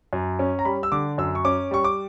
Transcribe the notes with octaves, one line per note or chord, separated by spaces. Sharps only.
F#2
C#4
A#5
G3 B5
E6
D3 D6
F#2 E6
C#6
C#4 D6
G3 C#6
D6